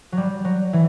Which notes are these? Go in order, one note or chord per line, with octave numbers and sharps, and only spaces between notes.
F#3 G3
F#3
E3